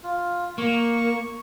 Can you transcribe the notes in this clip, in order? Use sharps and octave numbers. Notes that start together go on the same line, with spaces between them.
F4
A#3 C#6